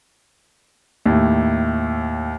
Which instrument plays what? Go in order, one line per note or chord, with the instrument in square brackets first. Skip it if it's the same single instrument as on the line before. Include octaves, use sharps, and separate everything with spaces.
[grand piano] D#2 A2